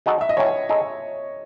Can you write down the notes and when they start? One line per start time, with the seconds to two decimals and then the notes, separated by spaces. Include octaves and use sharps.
0.06 G#3 D#4 F#4 A4
0.21 E5
0.29 D#5
0.37 A2 F#3 C#4 C#5
0.69 G#3 D#4 A4